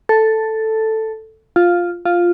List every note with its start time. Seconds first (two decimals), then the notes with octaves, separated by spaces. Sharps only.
0.09 A4
1.56 F4
2.05 F4